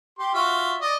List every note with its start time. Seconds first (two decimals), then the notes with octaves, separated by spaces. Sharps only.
0.19 G4 C6
0.34 F4 F#4 E5
0.81 D5 D#5